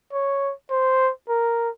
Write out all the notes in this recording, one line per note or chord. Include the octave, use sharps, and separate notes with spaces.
C#5
C5
A#4